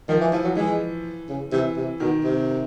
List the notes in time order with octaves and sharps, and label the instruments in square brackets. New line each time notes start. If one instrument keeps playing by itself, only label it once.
[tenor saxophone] D#3 [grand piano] F3
[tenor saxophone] E3
[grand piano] E3 [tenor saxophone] F3
[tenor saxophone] F#3
[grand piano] E3 [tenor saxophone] G#3
[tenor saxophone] C#3
[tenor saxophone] C3 [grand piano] E3
[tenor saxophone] C3
[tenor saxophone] B2 [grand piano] D#3
[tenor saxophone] C3